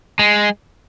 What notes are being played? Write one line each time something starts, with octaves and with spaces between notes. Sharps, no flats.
G#3